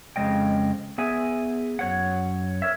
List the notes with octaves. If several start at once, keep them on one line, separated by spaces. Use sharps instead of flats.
F2 C#3 G#3 D#5 G5
B3 G#4 E5 G#5
F#2 C#5 F#5
A#4 C#5 E5